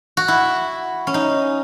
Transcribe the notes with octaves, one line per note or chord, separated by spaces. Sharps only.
F#4
E4
C#4
D#4